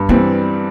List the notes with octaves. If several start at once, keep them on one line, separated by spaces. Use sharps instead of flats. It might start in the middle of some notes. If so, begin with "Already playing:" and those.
Already playing: G2
E3 G3 A#3 C4